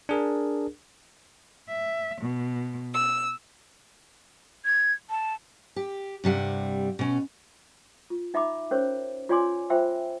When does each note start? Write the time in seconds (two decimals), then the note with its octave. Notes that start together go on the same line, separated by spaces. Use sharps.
0.09 D4 G#4 A#4
1.68 E5
2.21 B2
2.93 E6
4.65 G#6
5.10 A5
5.76 G4
6.24 G2 C3 G3 F#5
6.99 B2 C#4
8.10 F4
8.34 D#4 E5 A#5 B5 D6
8.71 C#4 A#4 C5 C#5
9.29 F4 C#5 D5 G#5 C6 D6
9.70 F4 C5 E5 G5 B5 E6